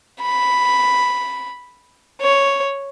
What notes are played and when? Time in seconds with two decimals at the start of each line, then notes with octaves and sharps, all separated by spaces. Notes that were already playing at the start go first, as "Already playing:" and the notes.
0.21 B5
2.21 C#5